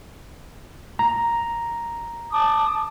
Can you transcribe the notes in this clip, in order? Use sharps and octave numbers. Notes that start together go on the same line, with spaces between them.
A#5
A5 D6 D#6